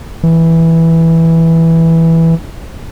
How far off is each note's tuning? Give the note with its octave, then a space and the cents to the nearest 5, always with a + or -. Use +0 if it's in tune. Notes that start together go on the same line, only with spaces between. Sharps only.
E3 -5